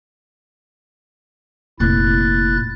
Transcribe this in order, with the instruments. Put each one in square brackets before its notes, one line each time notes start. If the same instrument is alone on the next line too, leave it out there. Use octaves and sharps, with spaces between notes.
[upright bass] F1 A#2 [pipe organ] E4 F#6 A6